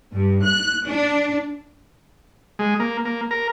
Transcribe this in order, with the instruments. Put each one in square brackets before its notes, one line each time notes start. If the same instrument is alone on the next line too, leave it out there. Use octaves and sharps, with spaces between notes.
[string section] G2
F#6
D4
[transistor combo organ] G#3
A#3
A#3
A#4